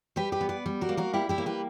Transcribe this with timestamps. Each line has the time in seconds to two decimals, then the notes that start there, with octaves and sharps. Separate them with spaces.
0.16 G3 G4 B4
0.32 G4 B4
0.41 B3
0.49 B4 D5
0.66 G3
0.81 F#4 A#4
0.89 A#3
0.97 F#4 A#4
1.13 G3 E4 G4
1.29 E4 G4
1.38 A#3
1.46 G4 B4